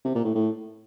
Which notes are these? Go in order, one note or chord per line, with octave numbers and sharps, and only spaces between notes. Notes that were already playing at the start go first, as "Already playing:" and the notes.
C3
A#2
A2
A2